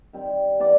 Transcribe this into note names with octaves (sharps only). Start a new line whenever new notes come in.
D#3 G3 C4
E3 G3 B3 D5